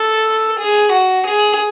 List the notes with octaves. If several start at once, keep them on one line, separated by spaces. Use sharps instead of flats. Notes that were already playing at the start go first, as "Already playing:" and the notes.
Already playing: A4
G#4
F#4
G#4